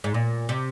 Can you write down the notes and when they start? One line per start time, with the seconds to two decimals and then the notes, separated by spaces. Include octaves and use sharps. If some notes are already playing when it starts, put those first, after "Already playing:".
0.04 G#2
0.14 A#2
0.49 C3